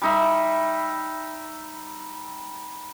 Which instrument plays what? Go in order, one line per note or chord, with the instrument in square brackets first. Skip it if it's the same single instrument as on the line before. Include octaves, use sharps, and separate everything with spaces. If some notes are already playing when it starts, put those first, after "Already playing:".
[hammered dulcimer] G3 D#4 E5